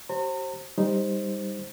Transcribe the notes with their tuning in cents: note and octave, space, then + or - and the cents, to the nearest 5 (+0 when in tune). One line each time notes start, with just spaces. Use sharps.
G4 -45 C5 +35 A#5 -40
G3 +20 D#4 +0 C5 +0